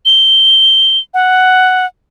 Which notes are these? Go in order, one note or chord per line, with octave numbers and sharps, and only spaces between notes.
G7
F#5